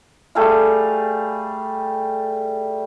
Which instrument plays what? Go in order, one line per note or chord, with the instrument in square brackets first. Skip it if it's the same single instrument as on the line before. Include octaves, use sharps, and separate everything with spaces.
[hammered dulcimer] G3 A3 G#4 F5